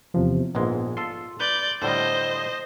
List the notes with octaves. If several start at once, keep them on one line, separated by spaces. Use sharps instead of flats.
E2 C3 F3
A#1 G#2 G#3 B3
F4 A4 C6
B4 D5 G6
A2 D3 G3 C5 D#5